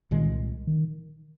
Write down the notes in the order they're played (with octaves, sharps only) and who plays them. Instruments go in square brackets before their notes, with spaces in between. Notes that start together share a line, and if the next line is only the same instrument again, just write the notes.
[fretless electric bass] C2 A#2 G#3 [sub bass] D#3
[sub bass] D#3